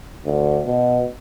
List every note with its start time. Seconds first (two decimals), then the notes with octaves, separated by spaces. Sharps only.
0.25 D2
0.65 B2